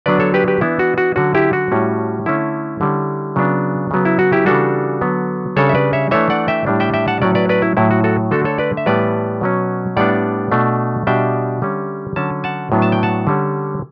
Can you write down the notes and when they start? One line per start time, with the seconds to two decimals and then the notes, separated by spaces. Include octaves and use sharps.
0.06 D3 F#3 B3 D4 B4 D5
0.20 A4 C#5
0.34 G4 B4
0.48 G4 B4
0.61 E3 B3 D4 E4
0.79 F#4
0.98 F#4
1.16 D3 F#3 C#4 F#4
1.35 E4 G4
1.53 F#4
1.72 A2 G3 C#4
2.26 D3 A3 C#4 E4
2.81 D3 G3 C#4
3.36 C#3 F#3 B3 D4
3.91 C#3 F#3 B3
4.05 E4
4.19 F#4
4.32 E4 G4
4.46 C#3 E3 G3 D4 F#4 A4
5.01 D3 F#3 B3
5.56 C#3 G3 D4 A4 C#5
5.69 E5
5.75 B4 D5
5.93 C#5 E5
6.11 E3 A3 D4 C#5 E5
6.30 D5 F#5
6.48 E5 G5
6.66 A2 G3 D4
6.80 E5 G5
6.94 E5 G5
7.08 F#5 A5
7.22 A2 F#3 C#4 D5 F#5
7.35 B4 D5
7.49 B4 D5
7.62 E4
7.77 A2 F#3 C#4 E4
7.91 F#4
8.04 F#4 A4
8.31 D3 A3 D4 F#4 A4
8.45 A4 C#5
8.58 B4 D5
8.77 E5
8.86 A2 E3 G3 B3 B4 D5
9.41 B2 F#3 C#4
9.97 A2 G3 B3 D4 D5 F#5
10.51 B2 A3 D4
11.07 B2 G3 D4 E5 G5
11.62 D3 G3 C#4
12.16 D3 F#3 C#4 A5
12.44 F#5 A5
12.72 A2 F#3 B3 D4
12.82 A5
12.92 G5
13.03 F#5 A5
13.27 D3 G3 C#4